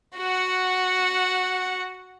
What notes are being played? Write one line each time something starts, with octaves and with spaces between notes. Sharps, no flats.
F#4 F#5